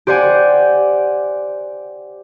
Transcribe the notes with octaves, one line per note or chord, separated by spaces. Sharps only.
G4 C5 D5 F#5 G#5